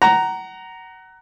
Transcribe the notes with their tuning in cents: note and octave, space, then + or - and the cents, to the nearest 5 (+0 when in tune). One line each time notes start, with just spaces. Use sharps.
F#5 +25 A#5 +0